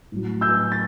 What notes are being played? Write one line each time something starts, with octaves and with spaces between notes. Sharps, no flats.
A2 F#3
E6 G6
A6